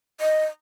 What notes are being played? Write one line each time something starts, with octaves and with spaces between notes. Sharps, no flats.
D#5